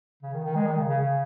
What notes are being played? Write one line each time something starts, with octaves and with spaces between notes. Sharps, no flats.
C#3
D#3
D#3
G#3
D#3
C#3
C#3
C#3